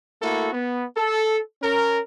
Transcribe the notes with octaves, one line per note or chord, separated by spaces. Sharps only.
A3 A#3 E4 F#4 A4
B3
A4
C#4 A#4